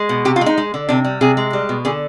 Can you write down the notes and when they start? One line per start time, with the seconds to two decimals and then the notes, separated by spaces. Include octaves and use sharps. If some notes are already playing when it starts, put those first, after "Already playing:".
Already playing: G#3
0.09 B2
0.25 C3 G4
0.36 F4
0.41 G#3
0.46 D#4
0.57 G#3
0.74 D3
0.89 C3 D4
1.04 G3
1.21 C3 G#4
1.37 G#3
1.53 G3
1.69 B2
1.85 D3 G#4